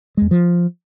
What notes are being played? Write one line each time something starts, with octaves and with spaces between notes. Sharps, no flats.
E2 G#3
F3